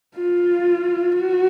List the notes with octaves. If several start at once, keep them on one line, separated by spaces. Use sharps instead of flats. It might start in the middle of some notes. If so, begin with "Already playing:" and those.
F4
F#4